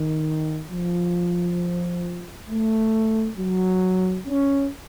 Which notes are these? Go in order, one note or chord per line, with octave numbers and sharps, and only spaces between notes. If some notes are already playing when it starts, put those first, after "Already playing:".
Already playing: D#3
F3
A3
F#3
C#4